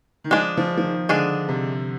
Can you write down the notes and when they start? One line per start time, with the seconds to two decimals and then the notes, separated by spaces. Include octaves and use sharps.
0.24 D#3
0.31 F3 G#3 D4 G#4
0.57 F3
0.78 F3
0.83 D#3
1.09 D3 G#3 D4 G#4
1.49 C3